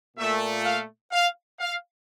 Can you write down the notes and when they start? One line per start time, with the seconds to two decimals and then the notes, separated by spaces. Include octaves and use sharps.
0.17 A#2 A3 E5
0.64 F5
1.12 F5
1.59 F5